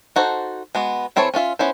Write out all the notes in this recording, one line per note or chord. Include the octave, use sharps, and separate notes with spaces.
D#4 F#4 A4 C5
G#3 B3 F#4
E3 C4 E4 A4 C#5
C#4 D4 F4 E5
B3 C#4 E4 C5